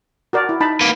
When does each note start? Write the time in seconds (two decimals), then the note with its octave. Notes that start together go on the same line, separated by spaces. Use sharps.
0.33 F#4 A#4 D5
0.49 E4
0.61 D#4 A5 B5
0.81 A#3 B4